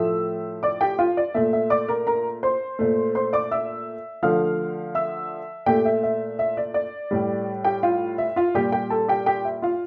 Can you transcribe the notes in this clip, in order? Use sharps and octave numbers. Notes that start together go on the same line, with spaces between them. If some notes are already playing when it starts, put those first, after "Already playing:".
Already playing: A2 F3 A3 E5 E6
D5 D6
G4 G5
F4 F5
D5
A#2 A3 E5
E5
D5 D6
A#4 A#5
A#4 A#5
C5 C6
A#2 A3
C5 C6
D5 D6
E5 E6
D3 F3 A3 F5 F6
E5 E6
A#2 A3 G4 G5
E5
E5
E5
D5
D5
A2 G3
G4 G5
F4 F5
E5
F4 F5
A#2 G3 G4 G5
G4 G5
A4 A5
G4 G5
G4 G5
E5
F4 F5